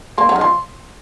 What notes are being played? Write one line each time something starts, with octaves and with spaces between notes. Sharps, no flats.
A#3 C6
F#3
D#3
F3 C6